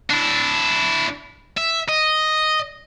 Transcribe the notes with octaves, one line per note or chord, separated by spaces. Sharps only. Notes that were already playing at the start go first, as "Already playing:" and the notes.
D4 E4
E5
D#5